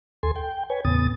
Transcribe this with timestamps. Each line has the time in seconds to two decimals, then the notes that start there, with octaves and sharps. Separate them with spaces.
0.23 D#2 A4 G#5 C6
0.36 G5
0.70 B4 C#5 G#5
0.85 E2 A2 C#3 B3 D#6 A6